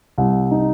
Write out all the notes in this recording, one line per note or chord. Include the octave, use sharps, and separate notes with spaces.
C2
D#4